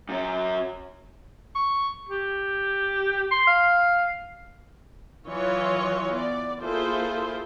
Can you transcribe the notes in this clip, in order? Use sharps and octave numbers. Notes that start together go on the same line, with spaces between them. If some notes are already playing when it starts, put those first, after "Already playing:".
F#2 C#4
C#6
G4
C6
F5
E3 F#3 F4 C#5 D#5
B3 D5
A#3 E4 F4 G#4 A4 C5